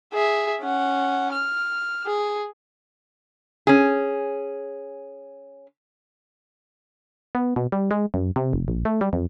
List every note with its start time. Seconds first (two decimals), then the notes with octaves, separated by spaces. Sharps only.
0.14 G#4 E5
0.62 C#4 F#5
1.32 F6
2.06 G#4
3.67 C#4 G#4
7.35 B3
7.56 B2
7.72 G3
7.91 G#3
8.14 F#2
8.36 C3
8.53 F1
8.68 A#1
8.85 A3
9.01 G3
9.13 F2